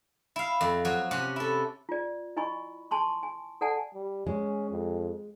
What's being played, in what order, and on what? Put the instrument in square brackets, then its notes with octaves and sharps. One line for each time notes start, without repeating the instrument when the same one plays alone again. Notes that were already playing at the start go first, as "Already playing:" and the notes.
[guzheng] E4 F5
F2
F3 F#3 F#4
C3 C#4 F#5
E4 A4
[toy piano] F4 D5
E4 D#5 G#5 B5 C#6
G#5 A5 C6 C#6
G#5
A4 D5 F#5 G#5 A5
[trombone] G3
[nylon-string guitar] G#3 [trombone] C#4
[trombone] F2